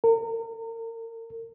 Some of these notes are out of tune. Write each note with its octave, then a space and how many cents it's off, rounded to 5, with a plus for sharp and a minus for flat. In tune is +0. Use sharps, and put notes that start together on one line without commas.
A#4 -35